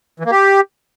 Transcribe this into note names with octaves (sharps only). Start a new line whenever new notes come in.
E3
A#3
G4